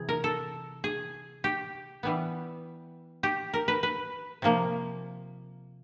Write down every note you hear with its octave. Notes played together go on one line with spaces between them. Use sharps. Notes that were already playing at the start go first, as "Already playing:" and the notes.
Already playing: C3 E3 G#4
A#4
A4
G#4
G4
E3 G3 B3
G4
A#4
B4
B4
C3 F3 A#3